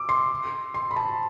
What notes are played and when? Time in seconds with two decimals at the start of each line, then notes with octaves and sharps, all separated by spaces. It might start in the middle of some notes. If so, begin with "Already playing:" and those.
Already playing: D6 E6
0.09 C6
0.74 C6
0.91 B5
0.96 A5